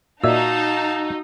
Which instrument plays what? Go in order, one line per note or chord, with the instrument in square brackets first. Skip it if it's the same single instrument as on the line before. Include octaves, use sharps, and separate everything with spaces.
[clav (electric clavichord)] A#2 D5 E5 [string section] D#4 [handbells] F#4 E6 [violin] F5 A5